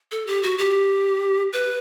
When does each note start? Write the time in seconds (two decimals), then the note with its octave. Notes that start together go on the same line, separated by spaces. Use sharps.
0.12 A4
0.27 G4
0.43 F#4
0.58 G4
1.53 B4